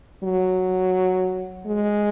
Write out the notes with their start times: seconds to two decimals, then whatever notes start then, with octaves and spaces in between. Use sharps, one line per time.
0.24 F#3
1.66 G#3